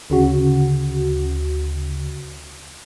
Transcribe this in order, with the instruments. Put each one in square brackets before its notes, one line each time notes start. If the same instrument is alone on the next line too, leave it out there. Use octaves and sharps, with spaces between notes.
[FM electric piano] D2 C#3 F#4